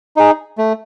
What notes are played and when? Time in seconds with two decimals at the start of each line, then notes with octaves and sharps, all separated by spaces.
0.17 D#4 G#4
0.58 A3